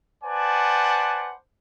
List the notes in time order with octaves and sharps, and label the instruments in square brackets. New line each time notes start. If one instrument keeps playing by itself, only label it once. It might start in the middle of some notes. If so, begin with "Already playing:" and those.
[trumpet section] B4 C5 D5 F#5 G#5 A5